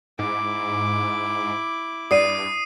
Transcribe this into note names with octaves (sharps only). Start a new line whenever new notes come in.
G#2 E4 D6
G2 D5 D#6 C7 D#7